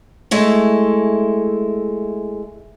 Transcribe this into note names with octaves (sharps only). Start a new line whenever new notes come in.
G#3 A3 E4